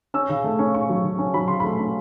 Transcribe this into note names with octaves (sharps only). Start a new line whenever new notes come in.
C#4 E6
C#3
A3
C#4
C#4 C#6
F#3
C#3
C#4
F#3 B5
C#3 C6
A3 B5
C#4